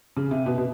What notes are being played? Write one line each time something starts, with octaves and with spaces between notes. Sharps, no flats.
C#3
C3
B2
B2